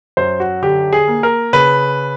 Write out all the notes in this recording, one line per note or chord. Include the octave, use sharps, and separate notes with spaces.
F#2 C5
F#4
D3 G4
G#4
A#3
A#4
C#3 B4